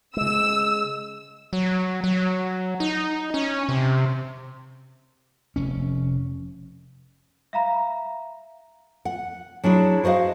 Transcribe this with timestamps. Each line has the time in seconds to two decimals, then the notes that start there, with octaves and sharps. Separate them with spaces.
0.17 C#3 G#3 E6
1.53 F#3
2.04 F#3
2.80 D#4
3.34 C#4
3.69 C3
5.56 F1 C#4
7.53 E5 F5 A#5 B5
9.05 F#5
9.64 F#3 D4 E4 G#4
10.04 F#4 C5 D5 D#5 F5